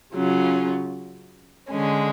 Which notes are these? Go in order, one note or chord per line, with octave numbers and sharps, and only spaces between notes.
C#3 F#3 C#4 F4
D3 G#3 C#4